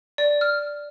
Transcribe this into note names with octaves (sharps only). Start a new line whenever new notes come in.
D5
F6